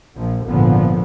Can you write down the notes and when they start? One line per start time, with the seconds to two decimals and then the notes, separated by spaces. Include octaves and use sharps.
0.15 A#1 F3
0.48 G#1 A#2 D3 F3 B3